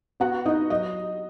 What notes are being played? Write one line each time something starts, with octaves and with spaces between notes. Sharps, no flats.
B3 F#4 F#5
B3 D#4 D#5
F#3 D#5